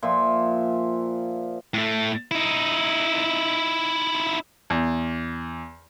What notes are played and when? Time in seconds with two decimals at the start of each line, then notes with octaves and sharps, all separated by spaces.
0.02 A#2 F3 E5 C6
1.74 A2 A3
2.31 D#4 E4
4.70 E2